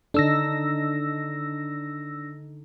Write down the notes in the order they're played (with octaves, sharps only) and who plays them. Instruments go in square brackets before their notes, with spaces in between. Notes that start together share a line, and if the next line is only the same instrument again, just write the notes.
[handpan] D3 D#4 A4 [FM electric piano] D4 E6 A#6